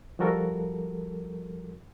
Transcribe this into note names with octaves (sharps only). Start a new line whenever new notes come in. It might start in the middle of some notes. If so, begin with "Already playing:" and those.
F3 G3 F#4 A4 A#4